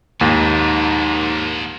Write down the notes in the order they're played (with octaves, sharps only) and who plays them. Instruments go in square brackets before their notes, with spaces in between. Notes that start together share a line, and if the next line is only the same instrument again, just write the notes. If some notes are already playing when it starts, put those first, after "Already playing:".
[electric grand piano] D#2 [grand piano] G#2 [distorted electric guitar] F3 A#3